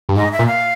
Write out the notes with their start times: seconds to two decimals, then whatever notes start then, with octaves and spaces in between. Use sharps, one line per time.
0.09 G2
0.16 G#2 D#5
0.32 E5
0.39 A#2
0.47 F5